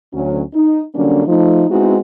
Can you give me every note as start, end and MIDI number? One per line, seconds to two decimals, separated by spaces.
0.14 0.41 38
0.14 0.41 54
0.14 0.41 61
0.54 0.82 63
0.95 1.25 50
0.95 1.25 54
0.95 1.25 55
0.95 1.25 58
0.95 1.25 61
0.95 1.25 62
1.26 1.64 53
1.26 1.64 57
1.26 1.64 63
1.69 1.97 56
1.69 1.97 59
1.69 1.97 60
1.69 1.97 63
1.69 1.97 64
1.69 1.97 66